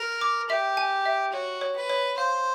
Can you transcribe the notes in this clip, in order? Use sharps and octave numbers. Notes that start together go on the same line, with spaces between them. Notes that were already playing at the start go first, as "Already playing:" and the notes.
Already playing: A#4
D6
G4 E5
G#5
E5
F#4 C#5
C#5
B4
C#5
C5 F5